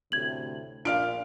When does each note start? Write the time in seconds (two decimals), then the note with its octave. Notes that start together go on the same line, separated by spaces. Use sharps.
0.12 D2 A2 C3 G#6 F#7
0.85 A#1 A#2 D4 F4 F5 F6 D7